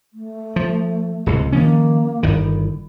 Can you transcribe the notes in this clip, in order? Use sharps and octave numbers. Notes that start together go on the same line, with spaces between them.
A3
F3
D1 C#2 C3
D#3 F3 A#3 C#4
G1 D#3 E4